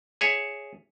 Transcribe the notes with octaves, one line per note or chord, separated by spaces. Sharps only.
G#4 C#5 E5